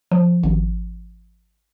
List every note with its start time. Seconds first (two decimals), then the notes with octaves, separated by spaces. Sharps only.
0.11 F3
0.43 G#1